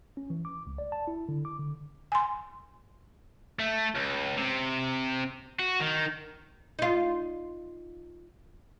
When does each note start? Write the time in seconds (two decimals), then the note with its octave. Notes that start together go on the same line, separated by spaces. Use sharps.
0.17 C#4
0.30 E3
0.45 D6
0.67 C#2
0.78 D5
0.92 A5
1.08 E4
1.29 D3
1.45 D6
1.59 D3
2.12 G#5 C6
3.59 A3
3.95 C#2
4.38 C3
5.59 F#4
5.80 D#3
6.79 D#4 F4